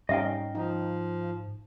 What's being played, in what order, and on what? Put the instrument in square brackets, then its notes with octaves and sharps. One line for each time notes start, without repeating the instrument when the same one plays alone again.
[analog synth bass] G#2 [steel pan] G3 C#4 D#4 [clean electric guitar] D#5 F5 G5
[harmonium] F3 [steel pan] D#4